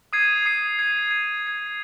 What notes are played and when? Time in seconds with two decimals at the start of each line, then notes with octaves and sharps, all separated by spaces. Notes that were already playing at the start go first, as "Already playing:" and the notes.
0.13 D#6 G#6 C7 D#7
0.46 D#6 G#6 C7 D#7
0.79 G#6 C7 D#7
1.11 G#6 C7 D#7
1.44 G#6 C7 D#7